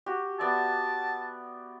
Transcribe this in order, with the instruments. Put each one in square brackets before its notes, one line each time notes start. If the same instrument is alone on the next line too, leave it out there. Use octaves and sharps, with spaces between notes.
[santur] F#4 G4
[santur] B3 D5 E5 [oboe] A5